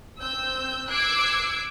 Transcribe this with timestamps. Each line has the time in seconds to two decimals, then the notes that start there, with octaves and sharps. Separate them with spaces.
0.20 C4 E6 G6
0.90 D6 E6 F#6 G#6 C7 D7